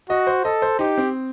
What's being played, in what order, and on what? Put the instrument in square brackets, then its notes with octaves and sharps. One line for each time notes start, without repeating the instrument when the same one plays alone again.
[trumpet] F#4 [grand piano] D#5
[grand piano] C5
[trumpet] A4 [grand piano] D#5
[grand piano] C5
[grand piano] D#4 [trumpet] G4
[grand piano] C4